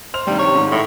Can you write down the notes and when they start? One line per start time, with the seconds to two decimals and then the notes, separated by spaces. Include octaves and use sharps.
0.14 C5 F6 F7
0.27 G2 C3 D#3 G3
0.39 C#5
0.55 G#2 D#3
0.71 A2